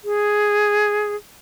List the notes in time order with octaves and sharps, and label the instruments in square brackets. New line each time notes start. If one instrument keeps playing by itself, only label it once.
[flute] G#4